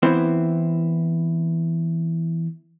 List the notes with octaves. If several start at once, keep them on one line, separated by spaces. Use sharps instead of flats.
E3 B3 C4 E4 C5